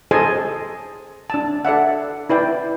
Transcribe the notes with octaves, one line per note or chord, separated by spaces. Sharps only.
G#4 A4 C5 D#5 G#5 A5
D4 A5
A4 D5 E5 F#5
E4 B4 D5 G5